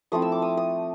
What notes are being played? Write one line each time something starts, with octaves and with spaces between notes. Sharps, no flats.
F3 A3 C4 E4 D#6
E6
D6
D#6
D#6